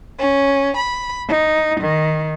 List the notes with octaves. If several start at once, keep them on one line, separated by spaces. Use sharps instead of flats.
C#4
B5
D#4
D#3